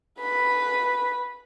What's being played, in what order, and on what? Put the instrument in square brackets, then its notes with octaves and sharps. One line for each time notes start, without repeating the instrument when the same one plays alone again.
[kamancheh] B4 B5